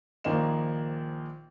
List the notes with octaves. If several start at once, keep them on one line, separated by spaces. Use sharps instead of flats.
A#1 D#3 A#3 C5 D#5 E7